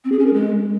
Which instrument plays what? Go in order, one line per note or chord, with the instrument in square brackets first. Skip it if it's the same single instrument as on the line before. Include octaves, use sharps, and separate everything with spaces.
[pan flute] C4
G#4
C#4
A#4
G#3